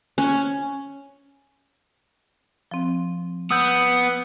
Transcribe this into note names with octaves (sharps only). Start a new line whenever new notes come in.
C#4
F3 C4
B3 D#6 E6 G6